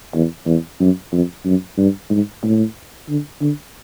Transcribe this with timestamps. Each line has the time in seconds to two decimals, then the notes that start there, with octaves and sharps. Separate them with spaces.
0.14 E2
0.46 E2
0.80 F#2
1.12 F2
1.45 F#2
1.78 G2
2.10 G#2
2.43 A2
3.09 D3
3.41 D3